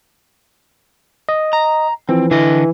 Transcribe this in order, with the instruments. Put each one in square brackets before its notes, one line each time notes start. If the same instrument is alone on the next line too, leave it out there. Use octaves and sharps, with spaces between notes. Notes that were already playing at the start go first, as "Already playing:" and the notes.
[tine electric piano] D#5
[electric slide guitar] A#5
[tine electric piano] E3 F3 [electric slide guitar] C4
[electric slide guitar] D3 D#5 [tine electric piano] E3